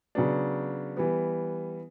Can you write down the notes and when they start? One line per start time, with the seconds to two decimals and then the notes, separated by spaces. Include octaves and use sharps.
0.15 C#3 F#3 B3 D4
0.97 E3 G3 B3